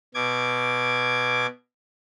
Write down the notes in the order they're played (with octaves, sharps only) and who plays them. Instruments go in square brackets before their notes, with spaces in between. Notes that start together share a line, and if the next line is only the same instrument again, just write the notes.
[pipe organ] B2 D6 G#6